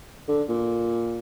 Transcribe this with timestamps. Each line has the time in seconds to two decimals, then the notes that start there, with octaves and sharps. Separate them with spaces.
0.28 D3
0.49 A#2